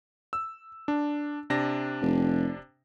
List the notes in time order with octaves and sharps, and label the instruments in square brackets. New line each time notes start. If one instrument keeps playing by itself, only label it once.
[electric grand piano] E6
D4
C3 D4 A#6
[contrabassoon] F1